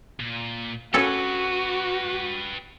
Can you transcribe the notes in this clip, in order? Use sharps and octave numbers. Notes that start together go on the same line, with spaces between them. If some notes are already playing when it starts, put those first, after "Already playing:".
A#2
C#4 F#4 G4 A4 B4